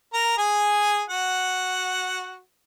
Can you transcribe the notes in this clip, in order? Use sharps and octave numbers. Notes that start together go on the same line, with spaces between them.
A#4 A#5
G#4 G#5
F#4 F#5